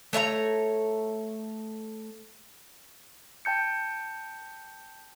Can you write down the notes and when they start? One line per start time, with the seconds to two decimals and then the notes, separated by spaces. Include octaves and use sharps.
0.13 A3 C#5 E5 A#5
3.45 G5 A5 G6 C#7